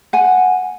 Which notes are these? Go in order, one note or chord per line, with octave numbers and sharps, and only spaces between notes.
F#5 G#5